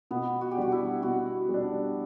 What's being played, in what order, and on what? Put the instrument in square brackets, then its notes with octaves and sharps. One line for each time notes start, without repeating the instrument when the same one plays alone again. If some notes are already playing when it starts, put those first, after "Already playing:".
[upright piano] B2 [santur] B3
[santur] F#4
G4
[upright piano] G3 D4 [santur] F#4
[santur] E4
[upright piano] B2 [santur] F#4
[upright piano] G3 D4